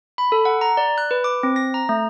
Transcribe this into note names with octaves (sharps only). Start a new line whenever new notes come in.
B5
A4
F#5
A#5
D5
F#6
B4
D6
C4
A#6
A#5
A3